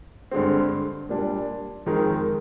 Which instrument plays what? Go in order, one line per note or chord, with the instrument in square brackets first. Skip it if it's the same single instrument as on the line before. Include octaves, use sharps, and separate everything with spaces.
[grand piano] G2 D3 G#3 C4
A#2 G3 D4
F2 D#3 G#3 D#4 A#4